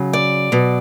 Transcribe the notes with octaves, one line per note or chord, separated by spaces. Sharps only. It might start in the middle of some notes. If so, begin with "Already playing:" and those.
Already playing: C#3 F#3
D5
B2 F#3